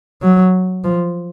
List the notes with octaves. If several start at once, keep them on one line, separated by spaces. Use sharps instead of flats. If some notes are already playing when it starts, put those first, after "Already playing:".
F#3
F3